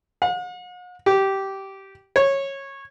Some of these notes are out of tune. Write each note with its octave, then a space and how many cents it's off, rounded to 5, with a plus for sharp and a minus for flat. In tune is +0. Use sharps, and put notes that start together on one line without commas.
F#5 -45
G4 -15
C#5 -15